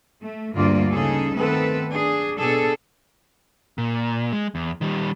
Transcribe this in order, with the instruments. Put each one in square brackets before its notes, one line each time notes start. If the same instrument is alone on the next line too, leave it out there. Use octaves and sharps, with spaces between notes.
[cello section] A3
D2 G2 A#3 F4 D5
C#3 D#4 G#4 A4
D#3 A3 B3 C4 A4 B4
D4 G#4
B2 D4 G#4 A4
[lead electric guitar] A#2
G#3
E2
D#3 G3